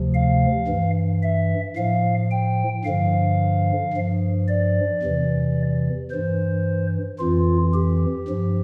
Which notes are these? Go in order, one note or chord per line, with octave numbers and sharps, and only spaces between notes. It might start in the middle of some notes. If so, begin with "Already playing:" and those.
Already playing: D2 C3 F3
F5
G2 E3
E5
A2 F3 F5
G5
G2 D3 F3 F5
G2 F3
D5
E2 C3 E3
G2 E3 C5
F2 E3 F4
G4
G2 F3